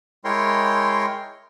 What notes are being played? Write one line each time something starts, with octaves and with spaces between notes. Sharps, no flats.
G#3 E4 A#4 C#5 G5 C6